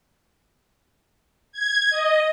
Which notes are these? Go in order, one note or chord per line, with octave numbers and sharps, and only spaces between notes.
G#6
D#5